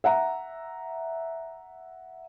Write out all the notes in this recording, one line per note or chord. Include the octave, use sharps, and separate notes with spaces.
E5 F#5 A#5